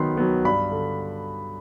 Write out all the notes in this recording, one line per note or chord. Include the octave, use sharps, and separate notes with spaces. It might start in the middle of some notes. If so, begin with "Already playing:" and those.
Already playing: D#3 F#3 B3 B5 C6
F#3 B3
G2 B5
D3